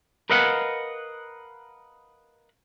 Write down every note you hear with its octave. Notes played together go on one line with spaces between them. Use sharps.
A#4 B4 D#5 F5 F#5